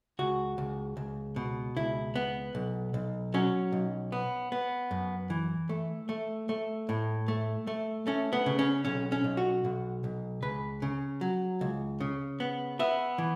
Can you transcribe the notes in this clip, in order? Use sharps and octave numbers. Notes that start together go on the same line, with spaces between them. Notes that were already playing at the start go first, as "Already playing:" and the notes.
C#2 F#4
C#2
C#2
B2
C#2 E4
B3
B1
B1
F#3 C#4
B1
B3
B3
F#2
E3
A3
A3
A3
A2
A3
A3
A3 C#4
B3
C#3
C#4
B1 C#4
C#4
B1
F#4
B1
B1
C#2 B4
C#3
F#3
C#2
C#3
B3
B3 E5
E3